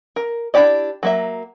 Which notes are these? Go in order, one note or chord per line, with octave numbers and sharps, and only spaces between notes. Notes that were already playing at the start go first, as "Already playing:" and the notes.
A#4
D4 E4 G4 D5 D#5
F#3 A#3 E5